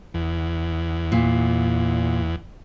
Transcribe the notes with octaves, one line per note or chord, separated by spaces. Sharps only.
E2
A#2